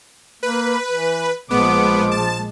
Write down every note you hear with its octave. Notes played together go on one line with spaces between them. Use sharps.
A#3 B4
E3
A#1 F3 G#3 B3 D6
A5